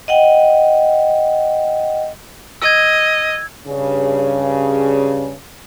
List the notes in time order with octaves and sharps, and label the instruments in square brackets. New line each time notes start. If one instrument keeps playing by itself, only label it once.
[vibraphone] D#5 F#5 G5
[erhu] D#5 [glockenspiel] E6 G#6
[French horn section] G2 C#3